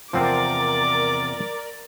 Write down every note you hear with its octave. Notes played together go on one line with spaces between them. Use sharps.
E2 C3 F3 C4 A#4 C5 D5 D6